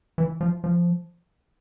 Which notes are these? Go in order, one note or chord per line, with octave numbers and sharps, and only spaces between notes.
E3
F3
F3